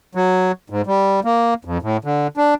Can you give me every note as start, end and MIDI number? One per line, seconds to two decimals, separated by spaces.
0.15 0.52 54
0.70 0.82 44
0.87 1.20 55
1.25 1.54 58
1.65 1.78 41
1.82 1.97 45
2.04 2.27 50
2.37 2.54 62